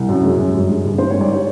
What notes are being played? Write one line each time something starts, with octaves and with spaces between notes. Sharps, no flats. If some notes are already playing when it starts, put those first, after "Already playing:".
Already playing: C2
F#2
G#3
F#2
G2
G#3
G2
G#2 C5
C#5
G3
D5
C#5